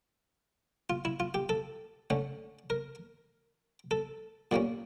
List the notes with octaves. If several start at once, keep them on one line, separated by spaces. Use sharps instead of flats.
F4
E4
F4
G4
A4
D3 A3 C#4
A#4
A4
A#2 G3 A#3 C#4